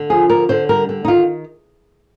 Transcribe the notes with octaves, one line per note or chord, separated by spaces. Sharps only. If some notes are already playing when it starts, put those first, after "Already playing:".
Already playing: D3
F3 G#4
D3 A#4
D3 C5
G3 A#4
D3
D#4
D#3 F4